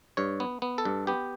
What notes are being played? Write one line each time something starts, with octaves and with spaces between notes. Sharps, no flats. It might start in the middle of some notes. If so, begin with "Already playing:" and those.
G2 C#5
B3
B3
A4
G2
B3 G4